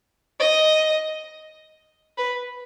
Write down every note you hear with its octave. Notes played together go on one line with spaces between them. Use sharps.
D#5
B4